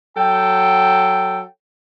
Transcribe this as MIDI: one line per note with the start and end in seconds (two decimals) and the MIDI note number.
0.17 1.42 54
0.17 1.42 69
0.17 1.42 79